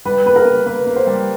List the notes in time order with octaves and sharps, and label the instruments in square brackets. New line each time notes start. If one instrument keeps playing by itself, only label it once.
[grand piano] G3 [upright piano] B4
[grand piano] A#3 [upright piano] B4
[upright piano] A#4
[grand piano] A#3
[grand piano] A#3 [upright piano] B4
[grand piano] A#3
[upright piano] C5
[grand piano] G3